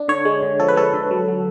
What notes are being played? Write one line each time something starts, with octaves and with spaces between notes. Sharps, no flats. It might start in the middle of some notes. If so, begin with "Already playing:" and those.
Already playing: D4
D3 C#5
G#3
D3
F3 A4
B4
G#3 A4
D3
F#3
F#3